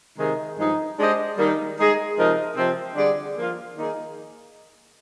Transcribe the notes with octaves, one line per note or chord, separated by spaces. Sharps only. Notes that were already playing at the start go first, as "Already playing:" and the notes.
C3 D#3 G#3 D#4 G#4
G2 F3 G#3 D#4
G#3 D4 G4 C5 D#5
D#3 G3 A#3 D#4
G#3 D#4 G#4 D#5
C3 F3 G#3 D#4 A#4
C3 F3 C4
D3 G3 D4 G#4 D5
F3 A#3 F4
D#3 A#3 D#4 G#4